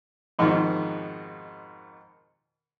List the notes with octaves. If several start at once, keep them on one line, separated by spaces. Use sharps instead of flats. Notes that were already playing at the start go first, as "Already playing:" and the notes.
F2 G#2 B2 D#3 F3